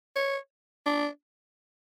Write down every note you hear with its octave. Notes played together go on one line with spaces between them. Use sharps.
C#5
D4